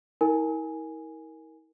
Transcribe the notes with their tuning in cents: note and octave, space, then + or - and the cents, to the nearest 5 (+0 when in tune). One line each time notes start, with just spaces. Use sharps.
E4 -45 A#4 +0 G#5 +0